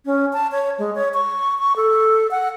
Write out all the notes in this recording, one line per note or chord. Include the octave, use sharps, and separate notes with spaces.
C#4
A5
C#5
G#3
C#5
C#6
C#6
A4
F#5